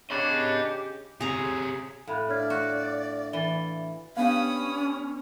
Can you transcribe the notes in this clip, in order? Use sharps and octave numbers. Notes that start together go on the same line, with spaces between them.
C#3 D4 G4 C#5 D#5 B5
C3 C#4 G#4 A#5
A2 F5 B5 F#6
D4 C#5 D5 E5 F5 F6 G#6
F#4
E3 A6 G7
B3 C#4 D4 G4 B4 F5 B5 D#6